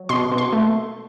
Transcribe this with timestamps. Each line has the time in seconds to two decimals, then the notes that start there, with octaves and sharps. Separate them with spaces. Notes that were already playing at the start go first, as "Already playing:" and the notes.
Already playing: F#3
0.09 B2 C6
0.31 B2
0.38 C6
0.52 A3